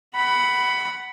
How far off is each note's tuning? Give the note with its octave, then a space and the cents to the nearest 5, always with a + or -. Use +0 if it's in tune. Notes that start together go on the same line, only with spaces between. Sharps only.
F#5 +20 B5 +0